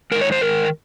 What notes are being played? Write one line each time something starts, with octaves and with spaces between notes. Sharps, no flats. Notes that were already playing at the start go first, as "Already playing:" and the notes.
G#2 D#3 A#4
C#5
C5
G#2 D#3 A#4